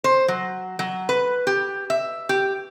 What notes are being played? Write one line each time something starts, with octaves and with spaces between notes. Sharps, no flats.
C5
F#3
F#3
B4
G4
E5
G4